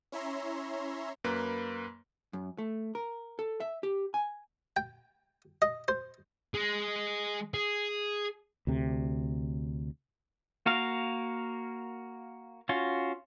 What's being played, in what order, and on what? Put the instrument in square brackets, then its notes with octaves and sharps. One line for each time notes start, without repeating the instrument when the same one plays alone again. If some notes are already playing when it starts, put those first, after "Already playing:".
[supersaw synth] C#4 E4 C#5 E5 A#5 C6
[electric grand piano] F#2 A#3 B4 B5
[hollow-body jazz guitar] F#2
A3
A#4
A4
E5
G4
G#5
[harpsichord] G5
D#5
C5
[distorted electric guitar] G#3
G#4
[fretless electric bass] D2 C3
[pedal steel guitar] A#3 F#4 A#4 F5
C#4 F4 F#4